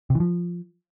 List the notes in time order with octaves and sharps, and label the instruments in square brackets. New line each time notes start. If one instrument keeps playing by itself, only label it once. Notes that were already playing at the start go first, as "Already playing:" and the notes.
[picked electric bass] C3
E3
F3